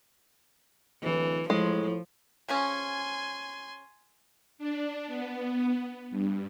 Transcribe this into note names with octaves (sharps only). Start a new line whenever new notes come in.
D1 E3
A2 F3 G#3
C#3 F3 C#4 G#5 C6
D4
B3
G2